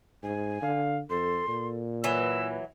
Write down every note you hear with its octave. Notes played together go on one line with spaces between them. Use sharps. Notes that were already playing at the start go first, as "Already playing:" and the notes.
G#2 G#5
D3 F5
F2 A4 C6
A#2 A4
E3 F#3 B4 E6